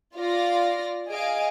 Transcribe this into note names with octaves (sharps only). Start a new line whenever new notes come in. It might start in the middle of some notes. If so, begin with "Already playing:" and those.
F4 D5 F5 A#6
G#4 D#5 F5 G#5 D7